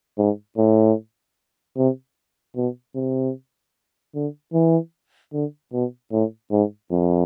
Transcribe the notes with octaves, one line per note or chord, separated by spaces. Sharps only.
G#2
A2
C3
B2
C3
D3
E3
D3
B2
A2
G#2
F2